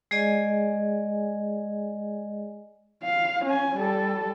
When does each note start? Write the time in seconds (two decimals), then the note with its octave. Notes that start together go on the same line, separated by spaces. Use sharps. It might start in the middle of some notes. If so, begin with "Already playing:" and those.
0.11 G#3 G#4 D5 D#5 G#5
3.03 F5
3.45 C#4 G#5
3.76 G3 A4